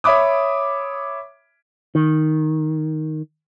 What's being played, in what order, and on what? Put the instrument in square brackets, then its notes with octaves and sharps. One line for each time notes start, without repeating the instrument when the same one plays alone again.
[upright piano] C#5 E5 B5 D6 D#6
[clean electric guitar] D#3